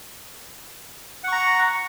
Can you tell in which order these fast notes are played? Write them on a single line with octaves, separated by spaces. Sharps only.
F#5 C#6 A#5